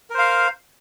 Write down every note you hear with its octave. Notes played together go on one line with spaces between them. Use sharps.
A#4 C5 F5